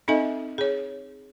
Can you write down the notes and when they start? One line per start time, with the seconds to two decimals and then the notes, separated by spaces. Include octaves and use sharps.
0.08 C4 D#4 A4 D#5 E5 G#5
0.58 G#4 C#5